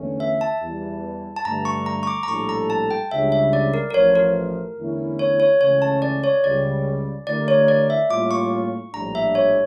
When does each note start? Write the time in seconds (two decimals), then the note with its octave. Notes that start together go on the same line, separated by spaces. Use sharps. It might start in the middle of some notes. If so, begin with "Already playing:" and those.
Already playing: E2 D3 A3 C#4
0.20 E5
0.41 A5
0.61 E2 E3 G3
1.36 A5
1.45 G2 D3 A3 A#5
1.65 C#6
1.86 A#5
2.03 C#6
2.07 D6
2.23 A#5
2.28 A#1 A2 G3 D4 A4 C#6
2.49 A#5
2.70 A5
2.91 G5
3.11 C#2 C#3 G3 D4 E5
3.32 E5
3.53 D5
3.74 A#4
3.90 A#4
3.94 A1 A2 F3 C#5
4.15 A#4
4.78 E2 D3 A3 C#4 E4
5.19 C#5
5.40 C#5
5.61 C#2 C#3 E3 A3 C#4 C#5
5.82 A5
6.02 D5
6.24 C#5
6.44 C#2 C#3 G3 D5
7.27 D3 A3 E4 G4 A#4 D5
7.48 C#5
7.68 D5
7.90 E5
8.10 A2 G3 A#3 C#4 F4 D6
8.31 C#6
8.93 A#1 A2 G3 D4 A#5
9.15 E5
9.35 C#5